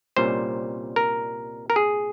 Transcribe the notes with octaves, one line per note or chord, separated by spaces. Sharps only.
C2 A#2 G3 C#4 C5
A#4
A#4
G#4